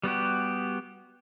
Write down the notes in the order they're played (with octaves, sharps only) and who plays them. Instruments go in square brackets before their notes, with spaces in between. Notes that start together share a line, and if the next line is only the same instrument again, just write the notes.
[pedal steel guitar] G3 B3 F#4 G4